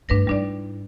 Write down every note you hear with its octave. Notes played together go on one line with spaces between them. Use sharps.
G2 A3 D4 B4 A#6
G#2 G3 D4 E4 D5